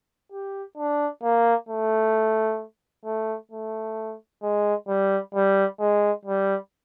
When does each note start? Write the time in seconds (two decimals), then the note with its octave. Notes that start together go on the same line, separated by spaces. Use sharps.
0.32 G4
0.77 D4
1.23 A#3
1.69 A3
3.05 A3
3.51 A3
4.42 G#3
4.88 G3
5.34 G3
5.80 G#3
6.25 G3